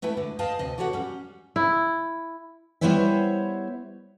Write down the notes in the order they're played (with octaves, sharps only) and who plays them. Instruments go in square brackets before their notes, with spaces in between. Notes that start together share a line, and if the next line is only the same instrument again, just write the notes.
[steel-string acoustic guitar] G#3 A3 E4 B4 G5
D3
G#4 B4 D#5 F5 G5 A5
D2 C3 D#5
F#4 G4 A4 C#5 D#5 F#5
G3 C#4
[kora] E4
[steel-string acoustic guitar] G3 B3 E4 C5 C#5 E5